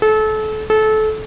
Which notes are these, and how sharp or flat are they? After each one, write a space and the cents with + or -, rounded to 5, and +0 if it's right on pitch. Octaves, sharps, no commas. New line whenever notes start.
A4 -30
A4 -25